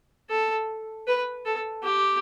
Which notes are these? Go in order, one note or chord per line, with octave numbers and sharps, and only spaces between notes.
A4
B4
A4
G4